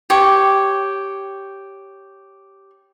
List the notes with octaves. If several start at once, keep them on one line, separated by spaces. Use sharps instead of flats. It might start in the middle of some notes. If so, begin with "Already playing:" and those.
G4 C#5